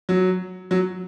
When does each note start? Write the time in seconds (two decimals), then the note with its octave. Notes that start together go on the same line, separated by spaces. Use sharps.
0.09 F#3
0.71 F#3